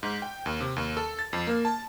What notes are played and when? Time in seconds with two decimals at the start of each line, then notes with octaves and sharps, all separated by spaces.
0.03 G#2
0.22 G5
0.46 D#2
0.60 C3
0.76 D#2
0.97 A4
1.19 A6
1.33 F2
1.47 A#3
1.65 A5